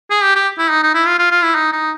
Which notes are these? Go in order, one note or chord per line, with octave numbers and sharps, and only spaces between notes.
G#4
G4
G4
E4
D#4
D#4
E4
F4
F4
F4
E4
D#4
D#4